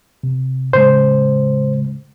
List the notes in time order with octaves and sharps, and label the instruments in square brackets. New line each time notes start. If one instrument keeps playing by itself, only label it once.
[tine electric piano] C3
[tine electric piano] A2 C#3 G#3 [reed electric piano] C5